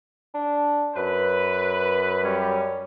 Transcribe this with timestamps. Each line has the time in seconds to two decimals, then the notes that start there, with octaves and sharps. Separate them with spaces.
0.34 D4
0.96 F#2 B4
2.24 G3 C#4